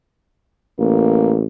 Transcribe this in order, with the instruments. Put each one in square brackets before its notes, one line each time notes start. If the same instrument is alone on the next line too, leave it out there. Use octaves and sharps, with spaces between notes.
[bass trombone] A1 [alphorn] A#3